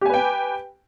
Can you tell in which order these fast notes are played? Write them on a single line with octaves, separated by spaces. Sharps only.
G4 G#5 B4 G5